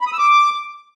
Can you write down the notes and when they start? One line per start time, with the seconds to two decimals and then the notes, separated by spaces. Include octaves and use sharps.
0.01 B5
0.07 D#6
0.13 E6
0.19 D6